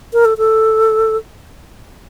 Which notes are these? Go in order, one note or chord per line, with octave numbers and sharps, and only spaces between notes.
A#4
A4
A4